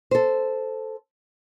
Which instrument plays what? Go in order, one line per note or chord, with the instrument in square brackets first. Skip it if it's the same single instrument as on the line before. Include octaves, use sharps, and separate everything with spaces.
[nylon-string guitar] A4 C5